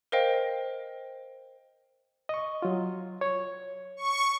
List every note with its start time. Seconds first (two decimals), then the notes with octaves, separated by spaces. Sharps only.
0.12 A#4 C5 D#5 F5 G5
2.29 D#5 C#6
2.62 F#3 F4
3.21 C#5
3.97 C#6